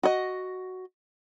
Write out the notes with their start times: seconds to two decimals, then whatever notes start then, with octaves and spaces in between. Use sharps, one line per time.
0.03 F#4 D#5